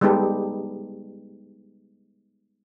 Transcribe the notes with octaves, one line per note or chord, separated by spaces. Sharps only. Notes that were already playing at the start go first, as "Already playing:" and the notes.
G3 G#3 B3 D#4 G4 A4